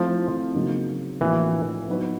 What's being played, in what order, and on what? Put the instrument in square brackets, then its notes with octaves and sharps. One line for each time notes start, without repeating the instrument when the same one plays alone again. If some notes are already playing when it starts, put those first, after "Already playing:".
Already playing: [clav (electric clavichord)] F3 [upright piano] A3 C4 E4
[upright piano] C#3 F#3 A#3 D#4 F#4
[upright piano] A2 F3 A#3 D4 F#4 [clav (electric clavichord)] E3
[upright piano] F#3 B3 D#4 F#4 B4